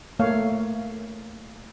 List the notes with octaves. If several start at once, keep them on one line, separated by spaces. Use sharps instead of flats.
A3 A#3 C#5 F5